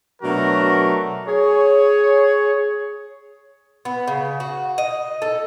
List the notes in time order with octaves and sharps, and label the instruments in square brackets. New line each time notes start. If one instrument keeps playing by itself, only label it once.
[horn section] B2 F#3 A3 D4 F#4 A#4
G#4 C#5
[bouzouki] B3
C#3
F#4
D#5
A4